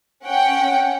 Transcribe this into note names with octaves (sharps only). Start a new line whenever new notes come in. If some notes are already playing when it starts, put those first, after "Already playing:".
C#4 F#5 G5